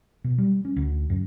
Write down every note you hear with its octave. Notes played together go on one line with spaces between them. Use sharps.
B2
G3
C#4
D2
F#2